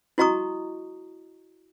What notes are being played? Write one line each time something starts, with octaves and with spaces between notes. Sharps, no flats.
E4 F#4 D#5 A#5 C#6 D#6